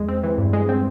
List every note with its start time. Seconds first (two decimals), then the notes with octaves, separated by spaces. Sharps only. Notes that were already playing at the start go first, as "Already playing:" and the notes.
Already playing: E2 G#3
0.08 C4
0.23 E3
0.38 G2
0.53 G#3
0.69 C4